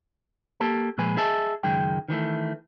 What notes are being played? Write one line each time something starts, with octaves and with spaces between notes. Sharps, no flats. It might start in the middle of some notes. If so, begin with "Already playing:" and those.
A#3 G4 A4 A5
A#2 F3 G#3 B4 G#5
G#4 D#5 E5 G#5 A5
C#2 F#2 D#3 G#3 G5
D#3 E3 G3 A3